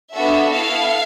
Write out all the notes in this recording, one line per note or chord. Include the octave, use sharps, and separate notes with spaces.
B3 D4 F#4 A4 E5
B3 E4 A4 F5